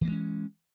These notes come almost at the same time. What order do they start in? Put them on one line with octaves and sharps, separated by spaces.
E3 A#3 G#3 C#4